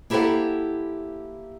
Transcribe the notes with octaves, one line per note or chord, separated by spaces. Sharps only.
A#3 E4 G4 A4 C5 F#5